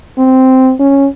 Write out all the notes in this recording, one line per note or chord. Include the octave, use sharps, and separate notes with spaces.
C4
C#4